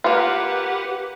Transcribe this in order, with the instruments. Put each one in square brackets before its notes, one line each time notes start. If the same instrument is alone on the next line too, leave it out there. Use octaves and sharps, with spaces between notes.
[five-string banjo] A#3 F4 [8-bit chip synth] G4 B4 F#5